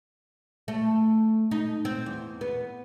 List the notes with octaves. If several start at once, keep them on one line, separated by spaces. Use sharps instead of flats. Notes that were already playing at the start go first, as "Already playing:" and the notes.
A3
D#4
C4
E2
B3